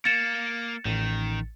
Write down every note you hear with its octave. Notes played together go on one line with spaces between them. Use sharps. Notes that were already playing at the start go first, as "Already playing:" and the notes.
A#3 A6 C#7 E7
A1 D#3